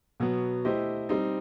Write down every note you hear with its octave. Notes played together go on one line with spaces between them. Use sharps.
B2 F#3 B3
A3 E4 G4 C5 D#5
G3 C4 D#4